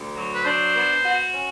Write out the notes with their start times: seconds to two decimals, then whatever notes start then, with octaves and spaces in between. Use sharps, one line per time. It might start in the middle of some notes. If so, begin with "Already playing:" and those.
Already playing: D2
0.16 F#3
0.34 B4
0.45 D4 C5
0.75 B3
1.05 F#4
1.34 C#4